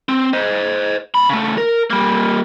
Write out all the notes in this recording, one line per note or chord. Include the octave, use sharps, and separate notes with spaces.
C4
C5 D#5
B2 B5
C#3 A3
A#4
G3 A#3